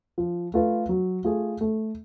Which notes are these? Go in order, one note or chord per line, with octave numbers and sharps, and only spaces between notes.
F3
A3 F4 B4
F#3
A3 F4 G#4
A3